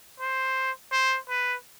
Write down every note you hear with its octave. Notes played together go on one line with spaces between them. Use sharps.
C5
C5
B4